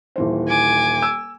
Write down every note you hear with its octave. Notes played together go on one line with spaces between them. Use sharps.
D#1 E3 C5
G#5 D6
E6